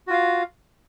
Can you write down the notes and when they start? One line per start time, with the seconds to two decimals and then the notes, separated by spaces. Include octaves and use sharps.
0.07 F#4
0.10 F4
0.13 F5